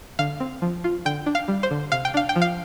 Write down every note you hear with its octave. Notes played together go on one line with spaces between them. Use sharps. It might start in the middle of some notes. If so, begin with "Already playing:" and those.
D3 F5
C4
F3
F4
D3 G5
D4
F5
G3
C5
D3
C3 F5
G5
D4 F5
G5
F3
F5